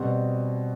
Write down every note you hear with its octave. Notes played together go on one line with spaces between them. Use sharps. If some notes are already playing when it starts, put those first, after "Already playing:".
Already playing: B2 G3 C4